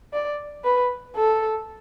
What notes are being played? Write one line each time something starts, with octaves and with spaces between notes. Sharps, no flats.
D5
B4
A4